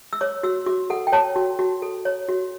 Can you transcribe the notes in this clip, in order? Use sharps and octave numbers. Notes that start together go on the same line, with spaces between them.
E6
C#5 D6
F#4 E6
F#4 D6
A4 F#5
G5
C#5 A5
F#4
F#4
A4
C#5
F#4